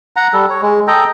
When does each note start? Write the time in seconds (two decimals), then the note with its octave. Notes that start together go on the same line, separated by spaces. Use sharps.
0.16 F#5 A#5
0.33 G3 A4
0.50 C#5
0.62 G#3
0.88 A4 D#5 G5 A#5